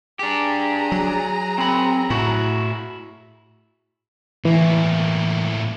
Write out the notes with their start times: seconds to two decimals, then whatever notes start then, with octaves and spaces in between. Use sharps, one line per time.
0.19 D4 G4 G#4 A#5
0.92 F#3
1.58 C4 B5
2.10 A2 E4 F#4
4.45 A2 E3 A#3